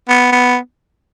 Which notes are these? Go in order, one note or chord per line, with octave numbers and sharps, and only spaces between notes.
B3
B3